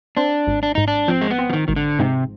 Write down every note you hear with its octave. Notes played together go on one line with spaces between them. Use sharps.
C4 D4
G#1
D4
G#2 D#4
D4
F3 C4
G#3
B3
C4
F3
D#3
G#1 D#3
D3
G#2 C3